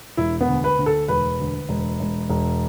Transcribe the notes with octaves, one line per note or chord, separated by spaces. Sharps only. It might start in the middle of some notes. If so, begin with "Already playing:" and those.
E1 E4
B3
D2
B4
D2
A4
E1 B4
D2
E1
E1
E1